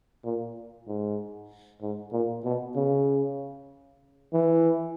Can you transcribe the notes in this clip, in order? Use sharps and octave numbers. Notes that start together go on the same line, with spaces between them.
A#2
G#2
G#2
A#2
B2
C#3
E3